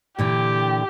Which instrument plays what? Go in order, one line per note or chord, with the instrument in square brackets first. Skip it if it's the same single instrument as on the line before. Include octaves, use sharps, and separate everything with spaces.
[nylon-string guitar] A#2 D3 E3 [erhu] G4